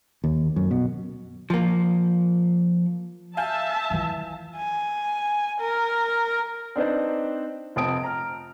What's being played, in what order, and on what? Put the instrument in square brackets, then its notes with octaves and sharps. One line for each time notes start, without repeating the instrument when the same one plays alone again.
[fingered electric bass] D#2
F#2
B2
[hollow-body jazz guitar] F3 A#3
[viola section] E5 A5 [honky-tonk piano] F5 G#5 G6
[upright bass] E3 F4
[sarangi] G#5
A#4
[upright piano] C4 D4 D#4 B4 C5 D5
F1 C3 C4 A5 D#6 D7
A#5 F6